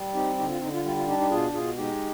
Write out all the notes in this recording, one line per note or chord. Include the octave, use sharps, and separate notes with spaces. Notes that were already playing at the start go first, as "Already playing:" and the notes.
Already playing: G3
C4 D#4 G4
D3 D#4 G4
F4
D3 D#4
F4
G3 F4
F4
D4 D#4 G4
D#4 G4
B2 F4 G#4
B2 F4 G#4
G#3 D#4 G4